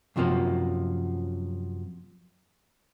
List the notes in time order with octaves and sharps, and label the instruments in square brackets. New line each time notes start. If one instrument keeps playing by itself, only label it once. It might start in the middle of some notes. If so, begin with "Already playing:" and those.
[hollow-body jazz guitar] F#2 C3 F3 F#3 A#3